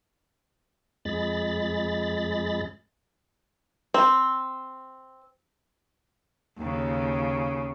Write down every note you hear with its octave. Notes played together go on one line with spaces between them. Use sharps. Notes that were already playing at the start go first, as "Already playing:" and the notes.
F2 G#3 B5 A6
C4
D#2 C#3